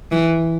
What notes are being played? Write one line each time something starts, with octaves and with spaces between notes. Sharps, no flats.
E3